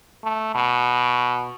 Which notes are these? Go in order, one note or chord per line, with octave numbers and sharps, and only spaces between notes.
A3
B2